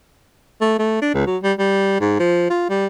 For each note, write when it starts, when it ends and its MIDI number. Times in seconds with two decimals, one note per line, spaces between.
0.61 0.75 57
0.79 1.01 57
1.02 1.14 62
1.14 1.24 37
1.27 1.37 54
1.43 1.53 55
1.59 1.98 55
2.01 2.17 44
2.20 2.48 53
2.50 2.67 65
2.70 2.87 55